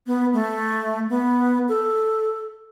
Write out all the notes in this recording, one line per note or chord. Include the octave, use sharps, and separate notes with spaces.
B3
A3
B3
A4